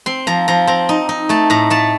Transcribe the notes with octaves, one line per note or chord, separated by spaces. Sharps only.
C4 C6
F3 A#5
F3 A#5
C4 A#5
D#4
D#4
A3 A5
A2 A#5
A3 A5